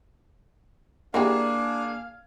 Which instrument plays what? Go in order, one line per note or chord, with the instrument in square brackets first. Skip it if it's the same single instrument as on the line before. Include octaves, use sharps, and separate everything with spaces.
[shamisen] G3 E4 F#4 [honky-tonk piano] A#3 G#4 [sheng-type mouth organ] D4 [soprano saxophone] F5